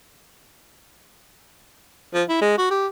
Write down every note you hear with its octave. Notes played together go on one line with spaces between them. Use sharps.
F3
E4
G#3
F#4
G4